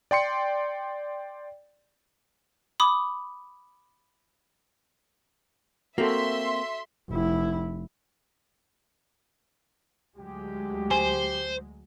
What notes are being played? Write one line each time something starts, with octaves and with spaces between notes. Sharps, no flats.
D5 G5 C6 C#7
B5 D6 D#6
A#3 C4 F#4 A4 E5 C6
F1 E4
D2 F#3 G#3 G4
C5 G#5